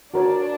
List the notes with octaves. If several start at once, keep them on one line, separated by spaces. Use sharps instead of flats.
D4 F#4 A#4 C#5